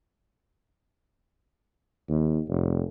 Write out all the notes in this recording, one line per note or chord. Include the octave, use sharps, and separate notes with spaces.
D#2
F1